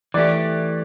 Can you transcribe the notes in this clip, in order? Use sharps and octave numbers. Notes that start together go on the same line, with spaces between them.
E3 A3 G4 D5